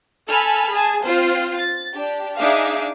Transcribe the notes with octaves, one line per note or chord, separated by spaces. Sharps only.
A4 G#5 A5 B5 F6
G#4 G#5 A5
C4 F4 C5
A6
D4 G4
D4 D#4 G#4 E5 F5 D6